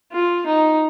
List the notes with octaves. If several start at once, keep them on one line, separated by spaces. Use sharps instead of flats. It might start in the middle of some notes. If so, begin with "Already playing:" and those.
F4
D#4